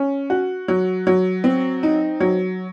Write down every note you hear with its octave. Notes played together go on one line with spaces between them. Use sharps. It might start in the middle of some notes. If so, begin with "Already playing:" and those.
Already playing: C#4
F#4
F#3
F#3
C4
D#4
F#3